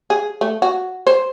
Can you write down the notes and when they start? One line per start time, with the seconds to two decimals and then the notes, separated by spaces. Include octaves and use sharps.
0.10 G#4
0.41 A3
0.62 F#4
1.07 C5